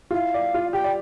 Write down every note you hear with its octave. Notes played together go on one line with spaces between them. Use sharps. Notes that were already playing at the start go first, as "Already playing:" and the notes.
F4
E4 F5
D5
F4
G4 G5
D5